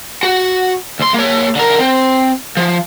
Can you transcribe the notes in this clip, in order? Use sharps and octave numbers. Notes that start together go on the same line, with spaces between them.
F#4
D2 C6
A#3 C#5
D3 A#4
C4
F3